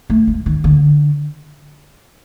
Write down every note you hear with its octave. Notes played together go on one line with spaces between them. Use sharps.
A3
G#3
D#3
D3